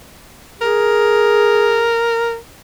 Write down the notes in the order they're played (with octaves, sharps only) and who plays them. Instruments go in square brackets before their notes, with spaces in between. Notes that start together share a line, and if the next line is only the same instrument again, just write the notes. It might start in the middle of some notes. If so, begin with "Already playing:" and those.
[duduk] G#4 [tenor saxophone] A#4